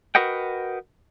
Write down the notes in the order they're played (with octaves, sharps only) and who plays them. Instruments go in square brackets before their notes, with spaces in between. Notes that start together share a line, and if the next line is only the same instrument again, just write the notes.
[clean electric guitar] F#4 A#4 B4 D#5 F#5 G5